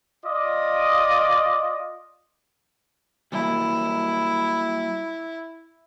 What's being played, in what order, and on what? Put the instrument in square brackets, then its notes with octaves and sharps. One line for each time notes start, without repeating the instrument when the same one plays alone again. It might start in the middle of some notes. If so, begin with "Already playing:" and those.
[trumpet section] F4 D5 D#5 D6 D#6
[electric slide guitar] F#3 G3 A#3 [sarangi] E4